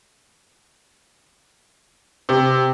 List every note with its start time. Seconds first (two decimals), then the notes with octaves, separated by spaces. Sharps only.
2.29 C3